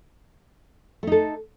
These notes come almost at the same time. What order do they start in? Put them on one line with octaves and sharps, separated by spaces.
A3 D#4 A4